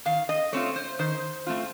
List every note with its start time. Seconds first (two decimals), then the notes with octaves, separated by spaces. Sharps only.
0.05 D#3 F5
0.29 D#5
0.52 A3 C4 F4 C#5
0.76 C5
0.99 D#3 C5
1.47 A3 C4 F4